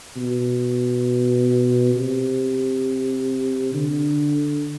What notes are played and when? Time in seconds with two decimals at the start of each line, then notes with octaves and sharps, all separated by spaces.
0.16 B2
1.95 C3
3.74 D3